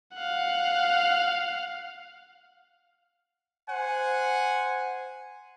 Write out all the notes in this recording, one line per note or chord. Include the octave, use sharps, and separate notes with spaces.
F5 F#5
C5 F#5 G#5